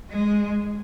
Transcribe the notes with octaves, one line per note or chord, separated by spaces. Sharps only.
G#3